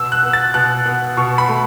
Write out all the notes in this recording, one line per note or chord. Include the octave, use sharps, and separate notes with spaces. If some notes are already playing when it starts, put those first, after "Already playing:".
Already playing: B2 E6
F#6
B3
A6
B2 F#6
B3
B2 C#6
B5
A3